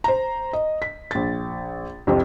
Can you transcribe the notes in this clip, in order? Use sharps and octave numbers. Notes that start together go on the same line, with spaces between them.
C5 A#5
D#5
B6
A#1 A6
C2 F2 C3 G3 C4